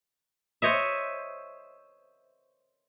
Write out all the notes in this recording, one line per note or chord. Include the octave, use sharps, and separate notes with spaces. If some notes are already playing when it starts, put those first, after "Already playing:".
C5 C#5 D#5 E5